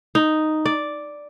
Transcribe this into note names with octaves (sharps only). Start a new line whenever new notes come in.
D#4
D5